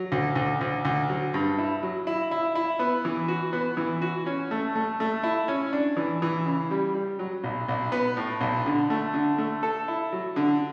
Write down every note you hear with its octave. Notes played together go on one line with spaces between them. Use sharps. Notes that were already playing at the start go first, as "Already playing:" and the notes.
Already playing: F#3
D2
D2
D2
D2
F#3
G2
E4
F#3
E4
E4
E4
B3
E3
F#4
B3
E3
F#4
C#4
A3
A3
A3
E4
C#4
D4
E3
E3
C#3
G3
G3
F#3
B1
B1
B3
A2
B1
D3
A3
D3
A3
A4
E4
F#3
D3